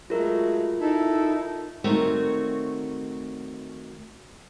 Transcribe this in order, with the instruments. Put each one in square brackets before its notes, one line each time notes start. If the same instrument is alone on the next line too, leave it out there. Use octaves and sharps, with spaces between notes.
[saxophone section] F#3 G#3 A3 [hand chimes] F4 A#4
[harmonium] D#4 A4 [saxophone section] E4
[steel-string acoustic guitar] D#3 A3 C4 F#4 A#4 C#5